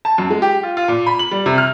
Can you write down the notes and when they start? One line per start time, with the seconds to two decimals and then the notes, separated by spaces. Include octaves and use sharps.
0.05 A5
0.18 F#2
0.30 G#3
0.42 G4
0.63 F4
0.77 F4
0.88 A#2
1.06 B5
1.19 F#7
1.31 G3
1.46 C3
1.58 F6